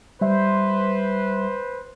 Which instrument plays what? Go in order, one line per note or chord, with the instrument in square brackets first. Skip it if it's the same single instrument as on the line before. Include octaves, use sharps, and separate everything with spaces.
[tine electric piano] G3 E5 [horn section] B4 C5